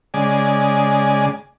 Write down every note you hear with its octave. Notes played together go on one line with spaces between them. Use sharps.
C#3 G#3 D5 G#5